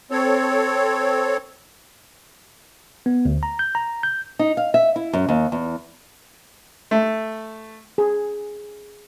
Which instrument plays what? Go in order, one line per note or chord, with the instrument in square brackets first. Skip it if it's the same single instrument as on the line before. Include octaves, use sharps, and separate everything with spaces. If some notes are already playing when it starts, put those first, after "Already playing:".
[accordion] C4 A4 C#5
[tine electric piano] B3
D2
A#5
G6
A#5
G6
[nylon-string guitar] D#4
F5
E5
E4
F#2
D#2
E2
[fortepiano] A3
[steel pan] G#4